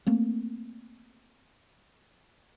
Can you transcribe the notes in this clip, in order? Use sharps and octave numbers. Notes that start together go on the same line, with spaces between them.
A3 A#3 C4